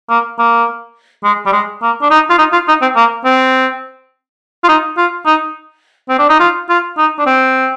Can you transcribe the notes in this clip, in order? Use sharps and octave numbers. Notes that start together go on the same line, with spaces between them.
A#3
A#3
G#3
G3
G#3
A#3
D4
D#4
F4
D#4
F4
D#4
C4
A#3
C4
F4
D#4
F4
D#4
C4
D4
D#4
F4
F4
D#4
D4
C4